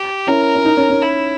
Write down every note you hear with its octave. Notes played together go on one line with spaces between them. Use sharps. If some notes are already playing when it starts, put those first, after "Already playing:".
Already playing: G4
C#4 E4 A#4
C#4
D#4
C#4
C#4
E4